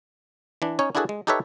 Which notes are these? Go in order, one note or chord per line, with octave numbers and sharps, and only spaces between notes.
E3 D4
C#4 D#4 C#5
D4 E4 F#4 G#4 A4 B4
G#3
D#4 G4 A4 B4 C#5 E5